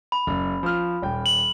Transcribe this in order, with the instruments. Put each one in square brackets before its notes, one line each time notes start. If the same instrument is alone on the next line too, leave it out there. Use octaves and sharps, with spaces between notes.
[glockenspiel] B5
[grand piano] F#1
F3 F6
D#1 G5
[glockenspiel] F#7